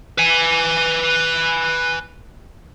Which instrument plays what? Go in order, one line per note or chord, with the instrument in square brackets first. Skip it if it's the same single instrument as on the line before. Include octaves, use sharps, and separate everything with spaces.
[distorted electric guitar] B4 G#5